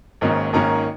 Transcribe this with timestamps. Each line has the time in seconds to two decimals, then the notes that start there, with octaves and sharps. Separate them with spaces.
0.21 G#1 G#2 D#3 A#3 C#4
0.53 G#1 G#2 D#3 A#3 C#4 A#5